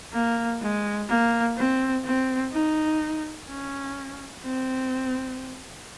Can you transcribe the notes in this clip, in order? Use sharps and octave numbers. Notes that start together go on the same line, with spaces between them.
A#3
G#3
A#3
C4
C4
D#4
C#4
C4